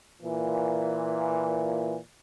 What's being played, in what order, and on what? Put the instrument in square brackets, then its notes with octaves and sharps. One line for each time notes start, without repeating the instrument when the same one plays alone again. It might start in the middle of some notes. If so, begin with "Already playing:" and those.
[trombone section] A#2 E3